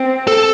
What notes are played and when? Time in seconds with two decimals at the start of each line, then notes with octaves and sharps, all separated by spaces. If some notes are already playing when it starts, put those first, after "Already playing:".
Already playing: C4
0.27 A4